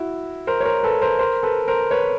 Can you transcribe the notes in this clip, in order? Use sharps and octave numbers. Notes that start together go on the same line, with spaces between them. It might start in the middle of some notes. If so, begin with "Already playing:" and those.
Already playing: E4 F#4
A#4 C5
C#5
A#4 C5
A4 B4
A#4 C5
A#4 C5
A4 B4
A#4 C5
B4 C#5